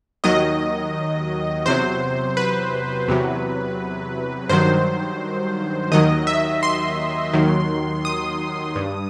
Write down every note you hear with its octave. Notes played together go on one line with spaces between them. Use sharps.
D#2 D#3 F#3 D#5
E2 C3 F#3 C5
B4
E2 C3 F#3
G2 D#3 F#3 C5
D#2 D#3 F#3 D#5
E5
C6
D#2 D#3 F#3
D#6
G2